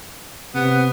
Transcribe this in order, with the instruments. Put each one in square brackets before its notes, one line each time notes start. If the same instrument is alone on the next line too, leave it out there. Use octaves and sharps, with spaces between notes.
[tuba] C3 [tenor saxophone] B3